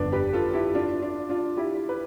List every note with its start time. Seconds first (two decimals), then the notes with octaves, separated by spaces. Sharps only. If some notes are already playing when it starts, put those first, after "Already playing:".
Already playing: G1 F2 D3 B3 D4
0.12 G4 B4
0.33 F4 A4
0.54 E4 G4
0.75 D4 F4
1.02 D4 F4
1.29 D4 F4
1.57 E4 G4
1.89 B4